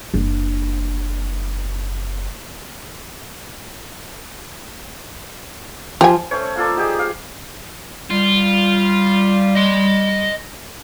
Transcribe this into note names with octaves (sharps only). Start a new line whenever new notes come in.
F#1 D4
F3 G4 G#5
A3 C#4 C5 C#5
A#3 F4 A4 D5
D#4 G4 G#4 D#5
F5
G3 F4
D#5 C6